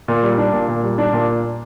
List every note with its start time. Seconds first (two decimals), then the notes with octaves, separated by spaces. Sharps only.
0.08 A#2
0.23 G3
0.38 D4
0.53 A#2
0.68 A#2
0.83 G3
0.98 D4
1.13 A#2